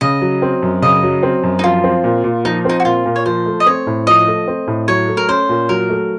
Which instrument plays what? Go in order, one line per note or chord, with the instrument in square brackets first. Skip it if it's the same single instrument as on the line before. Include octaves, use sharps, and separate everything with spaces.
[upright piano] C#3 [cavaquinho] D#5
[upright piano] F#3
C4
F#2
[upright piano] C#3 [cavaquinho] D#5
[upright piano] F#3
C4
F#2
[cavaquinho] D#4
[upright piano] F3 [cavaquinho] F4
[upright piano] C4
A#2
A#2
[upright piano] F3 [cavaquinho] D#4
[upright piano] C4 [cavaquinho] D#4
[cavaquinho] F#4
[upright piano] A#2 [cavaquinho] F4
[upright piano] A#2
[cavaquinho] C#5
[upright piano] F3 [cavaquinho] C5
[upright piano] A3
[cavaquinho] D#5
[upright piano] C4 [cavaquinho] C#5
[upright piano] A2
[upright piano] F3 [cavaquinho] D#5
[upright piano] A3
C4
A2
[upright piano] F#3 [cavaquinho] C#5
[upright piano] A3
[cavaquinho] A#4
[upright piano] C#4 [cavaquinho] C5
[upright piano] A#2
[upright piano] F#3 [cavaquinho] A#4
[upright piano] A3